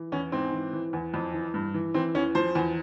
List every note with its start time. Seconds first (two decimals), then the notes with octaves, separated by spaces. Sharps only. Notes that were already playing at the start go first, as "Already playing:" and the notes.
Already playing: E3
0.12 E2 C#4
0.32 G#2 C4
0.52 E3
0.73 E3
0.93 E2
1.14 F2
1.34 E3
1.54 G2
1.74 E3
1.94 E3 C4
2.15 E2 C#4
2.35 F3 C5
2.55 E2